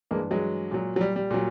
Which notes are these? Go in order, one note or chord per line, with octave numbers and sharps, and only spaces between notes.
G2 E3 G#3 A#3
F#3 G#3
A#2 F#3
F#3
G3
G3
A#2 F#3